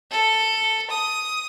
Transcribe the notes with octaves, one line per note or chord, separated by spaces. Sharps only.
A4
D#6